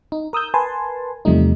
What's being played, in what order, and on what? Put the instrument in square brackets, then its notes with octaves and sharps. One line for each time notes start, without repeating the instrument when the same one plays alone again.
[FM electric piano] D#4
A#4 D#6 E6 G6
A#4 B4 G#5 A5 C6
E2 C3 F3 G3 A3 D#4